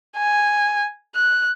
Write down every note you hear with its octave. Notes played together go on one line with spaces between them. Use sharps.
G#5
F#6